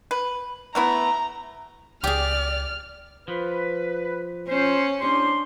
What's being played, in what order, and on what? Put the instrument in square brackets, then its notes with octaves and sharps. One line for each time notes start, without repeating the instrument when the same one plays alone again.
[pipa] B4
[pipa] A3 B3 E4 [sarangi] A#5
[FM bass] C#2 [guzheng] G4 G#4 [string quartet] D5 [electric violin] F6
[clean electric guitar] F3 [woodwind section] B4
[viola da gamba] C#4 [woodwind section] F4 C5
[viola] D4 C6 [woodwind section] E4 G4 C5